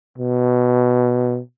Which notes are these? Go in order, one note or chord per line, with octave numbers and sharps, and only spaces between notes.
B2